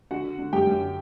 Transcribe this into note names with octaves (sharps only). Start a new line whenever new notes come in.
D3 F#4 F#5
D3
D3
F#2 G4 G5
F#2
D3